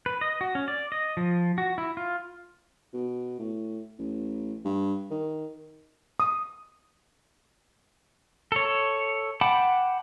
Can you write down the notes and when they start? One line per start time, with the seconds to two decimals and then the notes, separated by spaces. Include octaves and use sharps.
0.06 B4
0.21 D#5
0.41 F#4
0.55 C#4
0.68 D5
0.92 D#5
1.17 F3
1.58 F#4
1.78 E4
1.97 F4
2.93 B2
3.39 A2
3.99 A1
4.65 G2
5.11 D#3
6.20 D#6
8.52 A4 C#5
9.41 F#5 G5 A5 B5 D6